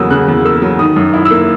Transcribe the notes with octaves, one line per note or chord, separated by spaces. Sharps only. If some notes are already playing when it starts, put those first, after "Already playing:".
Already playing: E2 C#3 F#3 A#3 D#6 E6
C#3 F#6
E2
A#3 E6
F#3
D#3 D#6
F#2
E4
E6
A#3